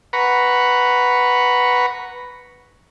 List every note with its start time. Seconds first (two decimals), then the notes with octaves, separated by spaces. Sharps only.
0.13 B4 F#5 A#5 B5 C#6